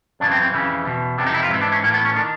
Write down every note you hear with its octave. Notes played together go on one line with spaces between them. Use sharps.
F#2 C#3 E3 D4
C4
C4
F2 C#3 E3
E2 B2
F2 C3 E3 D4
D#4
E4
F4
G#2 E3 E4
D4
C#4
A2 E3 A#3
B3
C#4
D#3 D4